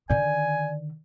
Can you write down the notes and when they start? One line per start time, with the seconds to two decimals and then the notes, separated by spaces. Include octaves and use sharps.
0.10 D3 D#3 D5 G#5